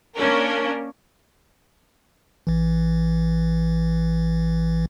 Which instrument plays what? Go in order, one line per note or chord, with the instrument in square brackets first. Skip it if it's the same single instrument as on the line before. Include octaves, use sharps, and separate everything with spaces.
[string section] A#3 C#4 D4 A#4
[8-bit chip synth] A1 E3